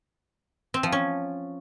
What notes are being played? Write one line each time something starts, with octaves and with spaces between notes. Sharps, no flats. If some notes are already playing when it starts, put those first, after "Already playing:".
C4
F3
C#4